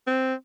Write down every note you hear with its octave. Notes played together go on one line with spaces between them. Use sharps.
C4